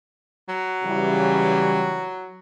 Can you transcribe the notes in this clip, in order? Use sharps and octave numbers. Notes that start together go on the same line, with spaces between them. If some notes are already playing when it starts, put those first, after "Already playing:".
F#3
C#3 E3 G3